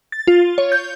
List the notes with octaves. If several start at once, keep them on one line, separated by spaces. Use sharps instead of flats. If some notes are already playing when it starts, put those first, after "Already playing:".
A6
F4
C#5
G6